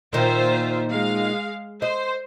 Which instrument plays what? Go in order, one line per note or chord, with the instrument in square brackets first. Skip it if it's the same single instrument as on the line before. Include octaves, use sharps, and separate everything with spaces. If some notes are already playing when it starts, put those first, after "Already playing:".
[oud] A#2 D#3 [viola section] F4 C5 E5
[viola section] G#3 F5
[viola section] C5 [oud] D#5